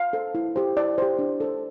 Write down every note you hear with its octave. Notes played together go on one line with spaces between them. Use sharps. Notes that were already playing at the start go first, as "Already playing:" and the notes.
Already playing: F5
A4 C5
E4
G4 C5
E4 D5
G4 C5
D4
A4 C5